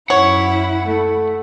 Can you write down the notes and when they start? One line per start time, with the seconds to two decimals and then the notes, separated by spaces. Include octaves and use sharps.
0.10 F#2 E4 C#5 F#5
0.85 A3